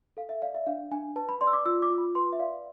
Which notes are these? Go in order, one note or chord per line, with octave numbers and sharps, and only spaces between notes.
A4 F5
E5
D5 F5
E5
D4 F5
D4 G#5
B4 A5
B5
D5 C6
E6
D6
F4 E6
D6
F4
B5
B4 C6
E5
D5 F5